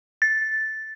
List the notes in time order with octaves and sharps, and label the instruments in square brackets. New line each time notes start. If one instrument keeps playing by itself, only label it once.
[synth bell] A6